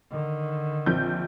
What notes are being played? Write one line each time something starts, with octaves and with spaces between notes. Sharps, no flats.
D3 D#3
A#1 C4 G6